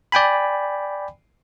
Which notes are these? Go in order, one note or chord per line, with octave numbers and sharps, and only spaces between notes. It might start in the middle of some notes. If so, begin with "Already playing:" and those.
D5 G5 G#5 B5